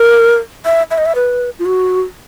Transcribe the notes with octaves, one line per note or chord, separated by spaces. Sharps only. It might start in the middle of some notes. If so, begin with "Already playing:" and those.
Already playing: A#4
E5
E5
D#5
E5
B4
F4
F#4